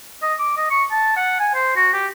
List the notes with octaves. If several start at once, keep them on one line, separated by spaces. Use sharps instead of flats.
D#5
D6
D#5
C#6
A5
F#5
G#5
C5
F#4
G4